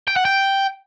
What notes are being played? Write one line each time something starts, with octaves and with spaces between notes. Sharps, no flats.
G5
F#5
G5